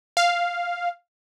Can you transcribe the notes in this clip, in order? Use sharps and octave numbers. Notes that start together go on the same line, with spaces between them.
F5